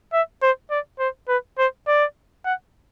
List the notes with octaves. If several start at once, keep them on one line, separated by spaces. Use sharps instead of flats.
E5
C5
D5
C5
B4
C5
D5
F#5